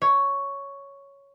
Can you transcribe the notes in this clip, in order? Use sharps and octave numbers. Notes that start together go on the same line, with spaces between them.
C#5